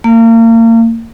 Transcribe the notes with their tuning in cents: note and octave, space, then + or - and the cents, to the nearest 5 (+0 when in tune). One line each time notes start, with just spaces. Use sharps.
A#3 -35